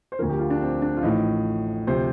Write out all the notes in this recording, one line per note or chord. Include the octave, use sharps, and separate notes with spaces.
C5
D2 D3 F3 A#4
G4
F4
D4
C4
D4
F4
A1 A2 F3 D#4
D2 C3 F3 C5